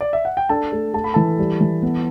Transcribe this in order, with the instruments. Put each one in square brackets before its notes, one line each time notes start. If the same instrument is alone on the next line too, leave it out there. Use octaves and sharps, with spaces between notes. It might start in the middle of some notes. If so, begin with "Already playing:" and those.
[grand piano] D5
E5
F#5
G5
[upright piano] D4 [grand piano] A4 A5
[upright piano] A3
[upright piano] A3 [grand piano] A5
[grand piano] B5
[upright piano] E3 [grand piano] A4 A5
[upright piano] G3
E3
B3